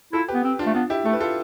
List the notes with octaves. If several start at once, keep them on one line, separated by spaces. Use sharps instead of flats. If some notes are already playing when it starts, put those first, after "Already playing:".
E4 F4 A4
G4 B4
B3
C4
D4 F4
A3
B3 D4 F4
E4 G4
A3 A4
B4
F4 A4